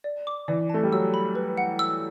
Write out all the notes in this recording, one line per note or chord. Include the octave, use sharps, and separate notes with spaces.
D5
D6
E3 D5
A3 A5
G3
F#3 E6
B5
B4
F#5
E6